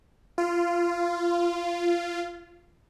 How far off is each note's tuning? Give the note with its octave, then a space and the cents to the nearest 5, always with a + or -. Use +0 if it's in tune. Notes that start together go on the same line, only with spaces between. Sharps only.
F4 -15